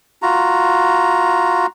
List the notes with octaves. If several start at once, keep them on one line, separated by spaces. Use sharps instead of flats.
F4 F#4 A#5